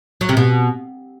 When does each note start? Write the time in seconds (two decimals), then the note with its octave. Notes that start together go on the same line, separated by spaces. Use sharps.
0.21 F#3
0.29 C3
0.37 B2